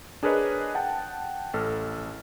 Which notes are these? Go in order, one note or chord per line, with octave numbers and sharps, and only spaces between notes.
D4 G#4 A#4 B4 C#5 D#5
F#5 G5 A5
A1 A4 F6